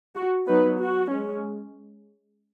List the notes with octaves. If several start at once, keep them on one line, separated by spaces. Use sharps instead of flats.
F#4
F#3 B3 D#4 B4
F#4
G#3 C#4